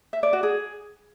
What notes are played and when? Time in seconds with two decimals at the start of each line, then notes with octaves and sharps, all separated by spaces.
0.13 E5
0.23 D5
0.33 F#4
0.43 G#4